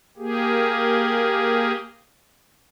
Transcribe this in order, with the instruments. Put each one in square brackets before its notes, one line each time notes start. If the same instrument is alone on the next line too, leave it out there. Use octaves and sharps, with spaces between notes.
[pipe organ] A#3 G4 G#4